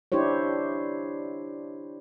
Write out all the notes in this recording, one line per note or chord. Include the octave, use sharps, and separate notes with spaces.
D4 E4 G4 C5 C#5